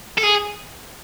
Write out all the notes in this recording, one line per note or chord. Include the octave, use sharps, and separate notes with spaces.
A4
G#4